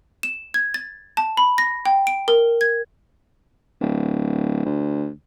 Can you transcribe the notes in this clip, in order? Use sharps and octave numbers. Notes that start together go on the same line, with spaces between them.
E7
G#6
A6
A5
B5
A#6
G5
D7
A#4
G#6
D1
D2